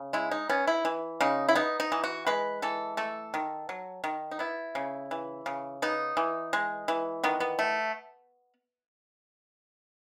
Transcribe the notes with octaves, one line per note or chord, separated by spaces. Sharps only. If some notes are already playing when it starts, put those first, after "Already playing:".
Already playing: C#3
G#3 E4
D#4
B3 C#4
E4
E3
C#3 D#4
E4
B3 D#4
D#4
E3
F#4
G#3 B4
E3 A4
A3 A4
D#3
F#3
D#3
D#4
B3 E4
C#3
E3
C#3
B3 D#4
E3
G#3
E3
D#3 B3
B3
A3